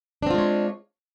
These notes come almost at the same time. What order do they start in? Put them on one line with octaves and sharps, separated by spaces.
D4 C4 F4 G#3 C#5